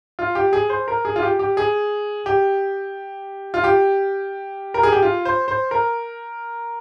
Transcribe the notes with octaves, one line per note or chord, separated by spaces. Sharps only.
F4
G4
G#4
C5
A#4
G#4
F4
G4
G4
G#4
G4
F4
G4
A#4
G#4
G4
F4
C5
C5
A#4